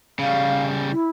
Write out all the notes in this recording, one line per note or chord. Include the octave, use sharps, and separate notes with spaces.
C#3 G3 F5
E4